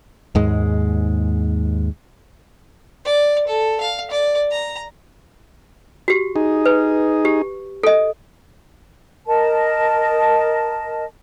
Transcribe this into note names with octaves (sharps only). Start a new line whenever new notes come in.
D#2 G#2 G#3
D5
A4
F5
D5
A#5
F#4 G4
D#4 G#4
B4
G4
A4 D#5
A#4 D#5 A5